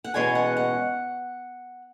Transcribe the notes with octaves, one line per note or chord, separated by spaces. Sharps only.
F#5
E2 B2 G#3 C#4 G#5
F#5
F#5